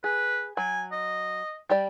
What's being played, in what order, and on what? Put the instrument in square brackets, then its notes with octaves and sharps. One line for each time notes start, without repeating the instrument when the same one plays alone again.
[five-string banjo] G#4 [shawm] B4
[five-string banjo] F#3 [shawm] G#5
[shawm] D#5
[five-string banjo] G3 G4 D5